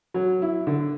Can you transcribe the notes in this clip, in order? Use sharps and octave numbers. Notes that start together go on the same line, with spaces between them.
F#3
E4
D3